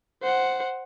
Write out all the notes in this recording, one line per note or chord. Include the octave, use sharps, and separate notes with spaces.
C5 F#5